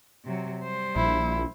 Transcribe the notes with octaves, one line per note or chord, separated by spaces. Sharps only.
C3 F#3
G3 C5
A#1 E4